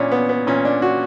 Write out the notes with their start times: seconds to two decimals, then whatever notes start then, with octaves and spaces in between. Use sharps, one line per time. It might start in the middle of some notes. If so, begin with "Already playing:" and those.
Already playing: A#2 C#4 D4
0.12 B3
0.29 B3
0.47 A#2 C#4
0.65 D4
0.82 F#4